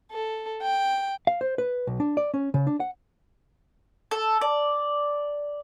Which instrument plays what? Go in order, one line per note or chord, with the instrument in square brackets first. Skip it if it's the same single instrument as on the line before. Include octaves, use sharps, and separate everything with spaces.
[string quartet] A4
G5
[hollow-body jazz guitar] F5
C5
B4
B1
D4
D5
C#4
C#3
D4
F#5
[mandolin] A4
D5